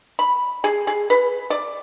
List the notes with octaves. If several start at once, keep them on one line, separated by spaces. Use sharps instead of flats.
B5
G#4
G#4
B4
D5